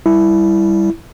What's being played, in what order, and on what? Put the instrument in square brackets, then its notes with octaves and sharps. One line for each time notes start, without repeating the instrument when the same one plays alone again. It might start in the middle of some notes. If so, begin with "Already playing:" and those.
[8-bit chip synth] G3 [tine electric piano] E4